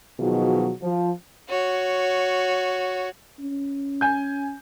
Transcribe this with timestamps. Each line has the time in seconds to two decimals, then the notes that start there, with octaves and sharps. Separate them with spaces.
0.20 B2 D#3 F3 F#3 F4 G#4
0.81 F3
1.49 F#4 C#5
3.39 C#4
4.01 G#5 G6